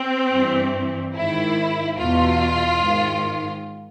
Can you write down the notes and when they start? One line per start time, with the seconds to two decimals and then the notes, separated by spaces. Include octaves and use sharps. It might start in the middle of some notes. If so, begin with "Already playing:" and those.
Already playing: C4
0.32 G2 E3
1.15 G#2 D#3 E4
1.97 E2 B2 F4
2.79 G#2 D#3